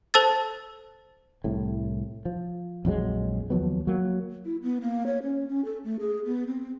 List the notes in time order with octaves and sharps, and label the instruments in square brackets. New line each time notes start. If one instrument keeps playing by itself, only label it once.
[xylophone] A4 C5 A5 E6 A6
[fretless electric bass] C2 A2
F3
A#1 F2 F#3 G#3
D#2 F3 F#3 B3
F#3 A#3
[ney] E4
B3
A#3
C#5
C#4
C#4
A4
A3
G#4
B3
C4